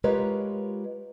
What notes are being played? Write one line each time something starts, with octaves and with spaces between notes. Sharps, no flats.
G#3 F4 G4 A#4 B4 C#5